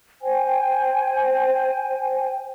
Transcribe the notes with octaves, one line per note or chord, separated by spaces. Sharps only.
C5 G5 G#5